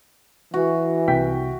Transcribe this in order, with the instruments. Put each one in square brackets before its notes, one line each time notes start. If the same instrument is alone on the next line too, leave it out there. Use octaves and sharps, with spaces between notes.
[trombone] E3 [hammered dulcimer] F#4
[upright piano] C2 G5 B6